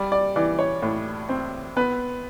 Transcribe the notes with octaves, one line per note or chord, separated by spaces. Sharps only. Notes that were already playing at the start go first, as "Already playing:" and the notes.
Already playing: G3 D5
D5
E3 D5
C#5
A2
C4
B3 B4